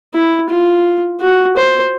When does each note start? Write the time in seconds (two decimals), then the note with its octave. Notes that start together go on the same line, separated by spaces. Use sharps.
0.15 E4
0.50 F4
1.21 F#4
1.57 C5